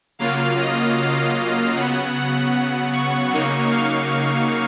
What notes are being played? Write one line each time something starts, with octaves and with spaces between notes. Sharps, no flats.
C#3 F#3 A#3 F4 F5
D#5
F5
C#3 F#3 B3 F#5
F#5
C#6
C#3 F#3 A#3 D#4
F5